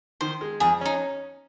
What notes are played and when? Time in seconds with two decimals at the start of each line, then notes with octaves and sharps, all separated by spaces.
0.21 D#3 C5
0.41 G#3
0.60 F2 G#4
0.81 C#4 D#4